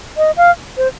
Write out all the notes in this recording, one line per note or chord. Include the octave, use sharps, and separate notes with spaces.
D#5
F5
C5